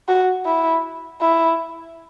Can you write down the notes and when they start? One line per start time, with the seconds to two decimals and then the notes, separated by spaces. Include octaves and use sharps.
0.09 F#4
0.46 E4
1.21 E4